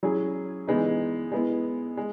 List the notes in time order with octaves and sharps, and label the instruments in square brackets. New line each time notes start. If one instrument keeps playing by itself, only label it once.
[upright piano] F#3 C#4 E4 G#4
E3 G#3 B3 D#4
G#3 B3 E4
G#3